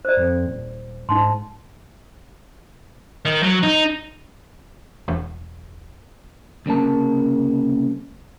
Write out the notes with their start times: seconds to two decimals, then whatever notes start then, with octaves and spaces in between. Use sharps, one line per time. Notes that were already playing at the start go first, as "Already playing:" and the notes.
0.05 C5 D5
0.17 F2
0.46 D#1
1.09 G#2 D#4 A5 C6
3.25 D#3
3.43 F#3
3.63 D#4
5.08 E1
6.66 C2 C#3 A#3 A5